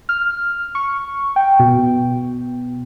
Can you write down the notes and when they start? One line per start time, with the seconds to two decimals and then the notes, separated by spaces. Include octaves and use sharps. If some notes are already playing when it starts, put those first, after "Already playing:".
0.09 F6
0.75 C#6
1.36 G5
1.59 B2